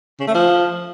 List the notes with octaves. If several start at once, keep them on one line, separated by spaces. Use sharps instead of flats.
C#3
A3
F3